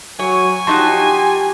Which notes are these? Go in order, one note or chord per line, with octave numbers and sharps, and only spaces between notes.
F#3 C#5 G#5
F3 D#4 F#4 G4 A5 C6 C#6